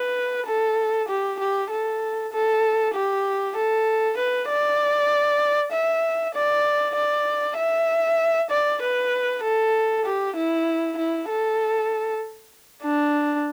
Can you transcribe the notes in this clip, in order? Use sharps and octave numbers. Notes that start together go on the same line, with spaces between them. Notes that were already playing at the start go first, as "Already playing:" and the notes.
Already playing: B4
A4
G4
G4
A4
A4
G4
A4
B4
D5
E5
D5
D5
E5
D5
B4
A4
G4
E4
E4
A4
D4